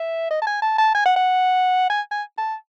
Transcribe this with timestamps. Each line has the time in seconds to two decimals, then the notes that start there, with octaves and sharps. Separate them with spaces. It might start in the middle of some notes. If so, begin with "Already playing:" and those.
Already playing: E5
0.30 D#5
0.42 A5
0.47 G#5
0.62 A5
0.78 A5
0.95 G#5
1.06 F#5
1.16 F#5
1.90 G#5
2.11 G#5
2.38 A5